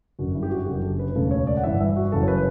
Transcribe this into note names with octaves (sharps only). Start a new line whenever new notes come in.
G1 F#2 D3 F#4
E4
G4
F#4
F#1 F#2 D3 G4
A4
B4
E1 D2 C#3 A4
C#5
D5
F#5
G1 G2 E3 E5
E5
F#4
F#1 F#2 C#3 E3 A4
C#5
B4